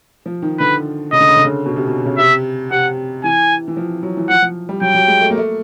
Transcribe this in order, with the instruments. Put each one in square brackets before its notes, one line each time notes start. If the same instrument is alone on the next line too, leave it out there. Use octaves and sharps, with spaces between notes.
[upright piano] F3
D#3
[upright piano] D3 [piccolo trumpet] B4
[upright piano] C#3 [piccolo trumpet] D#5
[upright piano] D3
C#3
D3
C#3
B2
C3
B2
C#3
[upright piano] C3 [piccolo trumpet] E5
[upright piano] C3 [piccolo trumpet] F#5
[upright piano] E3 [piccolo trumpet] G#5
[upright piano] E3
F3
F#3
E3
[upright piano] F3 [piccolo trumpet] F#5
[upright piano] F3
G3
[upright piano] F#3 [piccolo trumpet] G5
[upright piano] F#3
G#3
A3
A#3
A3